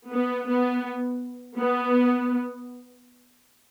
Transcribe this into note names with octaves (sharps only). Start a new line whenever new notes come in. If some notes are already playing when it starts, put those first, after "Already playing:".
B3
B3
B3